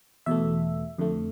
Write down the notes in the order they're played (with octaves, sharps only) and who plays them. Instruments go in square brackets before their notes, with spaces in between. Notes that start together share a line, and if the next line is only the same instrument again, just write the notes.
[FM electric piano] E2 B2 A3 E5
F2 D3 A3